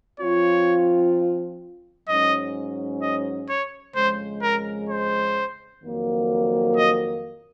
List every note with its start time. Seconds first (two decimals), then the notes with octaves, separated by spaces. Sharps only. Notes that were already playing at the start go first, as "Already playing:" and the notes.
0.20 F3 C4 F4 C#5
2.08 G#2 F#3 C#4 D#5
3.02 D#5
3.49 C#5
3.95 F2 C#3 G#3 C5
4.42 A#4
4.89 C5
5.83 F2 D#3 F#3 A#3
6.77 D#5